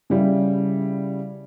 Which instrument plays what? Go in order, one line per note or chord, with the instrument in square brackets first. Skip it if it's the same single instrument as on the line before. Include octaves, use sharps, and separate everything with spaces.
[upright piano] C#3 G3 E4